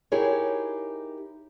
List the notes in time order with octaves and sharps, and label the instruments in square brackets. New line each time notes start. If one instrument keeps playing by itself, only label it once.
[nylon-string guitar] D#4 E4 G4 G#4 A#4 C#5